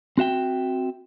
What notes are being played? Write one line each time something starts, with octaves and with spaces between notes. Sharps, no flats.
C4 F#4 E5 G5